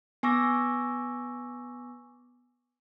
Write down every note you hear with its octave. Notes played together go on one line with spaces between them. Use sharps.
B3 G#5 C#6 D6 E6 A#6